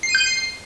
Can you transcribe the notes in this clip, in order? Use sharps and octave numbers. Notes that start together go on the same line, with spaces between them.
C7
D#7
G6
D#7
C7